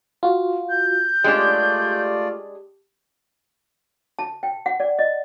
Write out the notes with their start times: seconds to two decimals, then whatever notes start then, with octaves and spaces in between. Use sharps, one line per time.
0.23 F4 F#4
0.70 G6
1.24 G#3 A3 C#4 D4 F4 G4 D5
4.19 A5
4.43 G5
4.66 F#5
4.80 D5
4.99 D#5